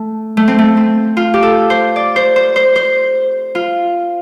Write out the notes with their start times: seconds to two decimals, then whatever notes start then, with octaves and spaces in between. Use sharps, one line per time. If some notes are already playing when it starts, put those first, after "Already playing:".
Already playing: A3
0.37 A3
0.48 C4
0.59 A3
0.77 C4
1.17 F4
1.34 G4
1.43 A4
1.70 C5
1.96 D5
2.16 C5
2.36 C5
2.56 C5
2.76 C5
3.55 F4